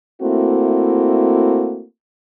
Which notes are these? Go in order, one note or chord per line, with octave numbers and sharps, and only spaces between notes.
A3 A#3 C4 E4 F#4